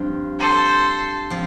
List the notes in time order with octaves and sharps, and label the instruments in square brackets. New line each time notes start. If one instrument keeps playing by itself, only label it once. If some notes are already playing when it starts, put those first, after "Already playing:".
Already playing: [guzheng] G2 F3 C4 F4
[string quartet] A4 C5
[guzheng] F3 C4